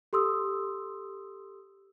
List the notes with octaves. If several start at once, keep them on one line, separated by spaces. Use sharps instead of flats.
G4 A4 C6 D#6 E6